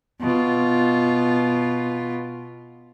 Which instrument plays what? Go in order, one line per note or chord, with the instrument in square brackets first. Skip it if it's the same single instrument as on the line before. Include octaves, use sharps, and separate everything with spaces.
[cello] B2 F4